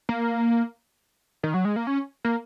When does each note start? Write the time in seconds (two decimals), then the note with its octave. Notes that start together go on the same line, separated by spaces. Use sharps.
0.09 A#3
1.43 D#3
1.54 F#3
1.65 G#3
1.76 A#3
1.87 C#4
2.25 A#3